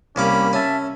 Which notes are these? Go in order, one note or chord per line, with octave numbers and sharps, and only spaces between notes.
C2 A#3 C#4 B5 D6
C#4 E5 A5